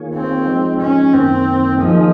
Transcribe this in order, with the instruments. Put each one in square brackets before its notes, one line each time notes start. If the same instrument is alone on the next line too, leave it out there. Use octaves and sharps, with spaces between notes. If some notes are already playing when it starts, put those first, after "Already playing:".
Already playing: [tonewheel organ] D#3 A#3 F4 G#4 C#5
[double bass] C4
[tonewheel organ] F3 G#3 D#4
[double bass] C#4
[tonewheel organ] F#2 D#3 A#3 [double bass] C4
[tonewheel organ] D#3 A#3 D#4 G#4 D#5 [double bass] F3